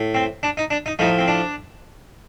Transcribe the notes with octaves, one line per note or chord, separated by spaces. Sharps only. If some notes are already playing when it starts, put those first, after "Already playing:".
Already playing: A2
C4
D4
D#4
D4
D#4
A2 F3 D#4
C4
D4